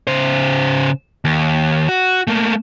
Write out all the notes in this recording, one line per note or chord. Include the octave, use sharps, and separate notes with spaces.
C#3 C5
D#2
F#4
A3 A#3